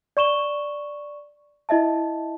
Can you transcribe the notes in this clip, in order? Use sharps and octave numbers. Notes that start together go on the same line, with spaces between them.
D5 C#6 E7 G7
E4 D#5 E5 A5